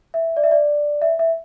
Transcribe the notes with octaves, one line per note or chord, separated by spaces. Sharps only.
E5
D5
E5
D5
E5
E5